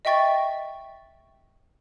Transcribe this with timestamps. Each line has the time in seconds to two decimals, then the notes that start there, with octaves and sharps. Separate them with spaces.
0.05 D#5 E5 G5 C#6 A6